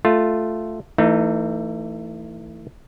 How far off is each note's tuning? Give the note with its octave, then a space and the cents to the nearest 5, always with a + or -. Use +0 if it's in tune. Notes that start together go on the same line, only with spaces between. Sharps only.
A3 +0 F4 +0
E3 +0 A3 +30 D#4 -5